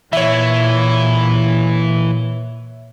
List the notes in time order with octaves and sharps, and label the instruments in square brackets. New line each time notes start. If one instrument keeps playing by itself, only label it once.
[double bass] A#2 [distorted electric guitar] E3 [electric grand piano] C#5 E5